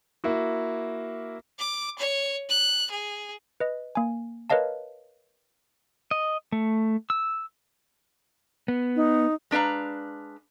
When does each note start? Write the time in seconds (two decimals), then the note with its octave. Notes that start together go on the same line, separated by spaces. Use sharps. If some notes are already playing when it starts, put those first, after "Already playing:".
0.24 A#3 E4 F#4
1.59 D6
1.98 C#5
2.49 F#6
2.91 G#4
3.60 B4 D#5
3.95 A#3 G#5
4.50 A#4 B4 C#5 D#5 F5 A5
6.11 D#5
6.52 A3
7.10 E6
8.68 B3
8.96 D#4
9.51 G#3 D4 B4 F5 A#5